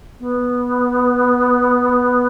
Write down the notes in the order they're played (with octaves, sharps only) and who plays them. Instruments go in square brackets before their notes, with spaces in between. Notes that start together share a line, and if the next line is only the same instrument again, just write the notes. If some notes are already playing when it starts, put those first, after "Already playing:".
[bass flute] B3